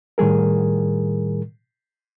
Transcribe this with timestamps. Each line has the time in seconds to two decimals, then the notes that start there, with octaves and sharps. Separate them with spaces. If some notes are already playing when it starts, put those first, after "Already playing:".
0.18 A2 D#3 G3 G#4 A#4